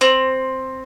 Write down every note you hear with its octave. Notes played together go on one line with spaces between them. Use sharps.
C4